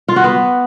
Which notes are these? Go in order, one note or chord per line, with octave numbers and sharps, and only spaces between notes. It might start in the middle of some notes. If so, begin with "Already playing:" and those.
F4
F#4
B3